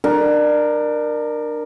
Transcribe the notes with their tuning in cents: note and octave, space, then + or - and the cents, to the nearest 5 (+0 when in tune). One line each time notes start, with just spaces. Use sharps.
D4 +30 A#4 +5